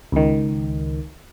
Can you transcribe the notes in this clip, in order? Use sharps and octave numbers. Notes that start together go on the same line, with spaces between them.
C#2 D#3